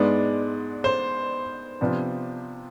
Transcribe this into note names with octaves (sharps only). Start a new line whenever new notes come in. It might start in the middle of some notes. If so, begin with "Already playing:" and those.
Already playing: G#2 G#3 B3 D4 D5
C5
C3 F3 B3 D4